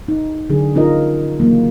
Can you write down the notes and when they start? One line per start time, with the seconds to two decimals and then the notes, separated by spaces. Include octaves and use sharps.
0.08 D#4
0.50 D3 F#3 D4 G#4
0.75 C#4 D#4 F4 A#4 D#5
1.40 C#3 E3 F#3 A#3